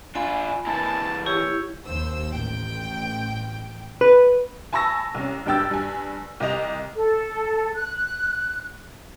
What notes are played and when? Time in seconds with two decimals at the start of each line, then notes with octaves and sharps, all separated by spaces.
0.15 D4 F4 G#5 B5
0.67 E3 A#3 A5
1.26 E4 G4 C#5
1.86 D#2 C5 E6
2.31 A1 G5
4.01 B4
4.73 G#5 A5 B5 C#6 E6 A#6
5.14 C2 C#4
5.46 F#1 G2 D4 G5 E6 A6
5.71 G2 G#5
6.40 C2 G4 D#5 F7
6.96 A4
7.74 F#6